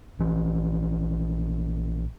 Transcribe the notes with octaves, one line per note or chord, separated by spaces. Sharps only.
A#1 E3